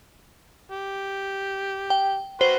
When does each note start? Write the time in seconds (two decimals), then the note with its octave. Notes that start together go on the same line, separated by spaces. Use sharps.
0.72 G4
1.90 G5
2.41 F#4 B4 C5 C6